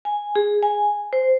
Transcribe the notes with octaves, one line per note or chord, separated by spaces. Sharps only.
G#5
G#4
G#5
C5